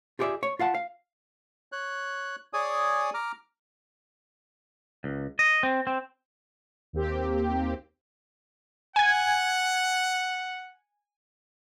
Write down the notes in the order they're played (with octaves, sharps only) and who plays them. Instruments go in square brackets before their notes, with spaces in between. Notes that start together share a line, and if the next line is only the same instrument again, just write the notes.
[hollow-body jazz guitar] F4 G4 G#4 C#5 D5 E5
C#5
F4 F5 F#5 A5
F5
[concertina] C#5 F#6
G#4 C#5 D5 G#5 D#6
A#5 D6 F6
[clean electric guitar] C#2
D#5
C4
C4
[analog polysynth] D#2 A#3 C4 G4
[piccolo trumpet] F#5 [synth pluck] G#5 G#6